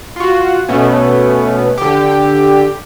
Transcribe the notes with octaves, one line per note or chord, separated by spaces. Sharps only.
F4 F#4
B2 A3 B3 C#4
D3 G4